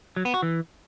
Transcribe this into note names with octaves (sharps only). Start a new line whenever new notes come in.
F#3
B3
F#4
E3